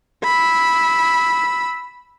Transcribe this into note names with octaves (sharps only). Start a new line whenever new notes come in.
B5 E6